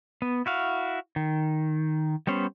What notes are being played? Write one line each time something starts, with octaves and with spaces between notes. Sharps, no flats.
B3
E4 F#4 F5
D#3
G3 B3 C#4 C5